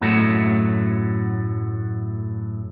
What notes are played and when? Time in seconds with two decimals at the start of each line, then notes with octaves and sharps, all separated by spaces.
0.01 F#2 A2 F#3 A3